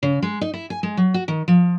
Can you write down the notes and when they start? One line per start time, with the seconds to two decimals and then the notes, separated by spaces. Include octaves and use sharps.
0.03 C#3
0.22 G#3
0.41 D#4
0.54 E4
0.70 G#5
0.83 G#3
0.97 F#3
1.14 F#4
1.28 D#3
1.48 F3